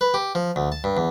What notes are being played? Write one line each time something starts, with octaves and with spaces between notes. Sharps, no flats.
B4
G4
F3
D2
A5
G2
E2